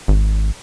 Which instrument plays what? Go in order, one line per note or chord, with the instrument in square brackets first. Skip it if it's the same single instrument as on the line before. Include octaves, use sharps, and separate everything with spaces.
[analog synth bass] G#1